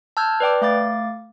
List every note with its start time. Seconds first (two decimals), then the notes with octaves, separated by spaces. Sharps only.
0.17 A5 E6 F6 G6 G#6
0.40 B4 D5 G5 D6
0.61 A3 F5 D6 A6